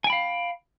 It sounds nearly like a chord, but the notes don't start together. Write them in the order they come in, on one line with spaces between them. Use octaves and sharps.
G#5 G5 B5 F5